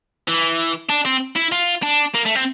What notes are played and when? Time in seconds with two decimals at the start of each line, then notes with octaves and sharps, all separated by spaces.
0.28 E3
0.90 D4
1.06 C4
1.36 E4
1.52 F4
1.83 D4
2.15 A#3
2.26 A3
2.35 C4